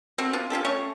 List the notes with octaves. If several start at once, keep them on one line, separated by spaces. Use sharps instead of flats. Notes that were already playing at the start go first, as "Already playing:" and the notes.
A3 C4 F#4
B3 D4 F4
C#4 F4 G4 A4
A3 C#4 C#5 C#6